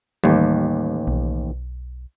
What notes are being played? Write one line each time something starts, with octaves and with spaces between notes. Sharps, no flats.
A1 D#2 G3
B1